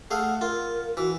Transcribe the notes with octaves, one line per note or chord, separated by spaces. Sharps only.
A3 G#4 F5 F#5
F4 A#4
E3 F#4